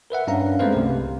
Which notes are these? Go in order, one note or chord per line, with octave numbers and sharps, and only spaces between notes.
A#4 B4 E5 F#5
G2 C#4 D4 F5 A#5
G#3 A3 C4 B4 C5 F5
C2 C3